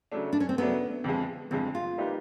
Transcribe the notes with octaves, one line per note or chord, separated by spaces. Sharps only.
C#3 F#3 A3 D4
D4
C#4
C4
C#3 F#3 A3 B3 D4
F2 D3 F3 G#3
F2 D3 F3 G#3 C4
F4
G3 A#3 D#4 G4 B4